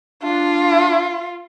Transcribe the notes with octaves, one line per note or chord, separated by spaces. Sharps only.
D4 F4